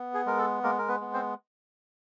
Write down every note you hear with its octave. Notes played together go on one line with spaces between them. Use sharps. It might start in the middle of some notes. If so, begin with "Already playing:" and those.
Already playing: B3
G#4
G#3 A#4
A4
G#3 A#3 A#4
A#4
B3 B4
B3
C4 C5